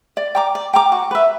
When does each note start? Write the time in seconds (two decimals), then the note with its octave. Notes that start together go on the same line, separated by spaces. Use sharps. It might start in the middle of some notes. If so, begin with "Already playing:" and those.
0.17 D5
0.35 G5 A#5 D6
0.55 D5
0.73 G5 A#5 D6
0.92 F#4
1.11 B4 E5